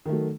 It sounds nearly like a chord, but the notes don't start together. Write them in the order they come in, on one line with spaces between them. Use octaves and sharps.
D#3 A3 F#3